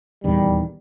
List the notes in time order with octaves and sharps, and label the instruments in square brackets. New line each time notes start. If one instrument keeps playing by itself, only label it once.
[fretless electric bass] D#1 E2 D#3 [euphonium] G3